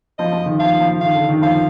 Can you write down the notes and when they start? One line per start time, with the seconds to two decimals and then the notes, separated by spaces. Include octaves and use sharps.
0.19 F3 D#5
0.32 F3
0.46 D#3
0.60 F3 F5
0.81 F3
1.01 D#3 F5
1.15 D3
1.29 D#3
1.42 F3 F5